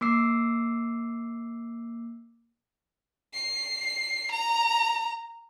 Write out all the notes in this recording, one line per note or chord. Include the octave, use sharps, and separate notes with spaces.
A#3 D6 E6 C7
C7
A#5